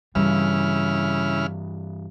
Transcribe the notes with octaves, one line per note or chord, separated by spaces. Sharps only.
G2 C#3 E3 G3 E4 F6